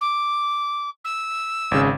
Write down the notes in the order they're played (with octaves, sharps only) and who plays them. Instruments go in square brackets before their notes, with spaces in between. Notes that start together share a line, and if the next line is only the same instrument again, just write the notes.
[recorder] D6
E6
[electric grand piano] G#1 C#3